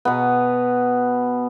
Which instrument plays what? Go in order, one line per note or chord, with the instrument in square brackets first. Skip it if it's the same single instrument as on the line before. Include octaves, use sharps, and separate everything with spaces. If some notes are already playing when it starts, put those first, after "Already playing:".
[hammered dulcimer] B2 B3